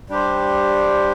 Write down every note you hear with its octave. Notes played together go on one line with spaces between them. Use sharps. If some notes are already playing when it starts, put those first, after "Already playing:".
G3 D4 G4 C5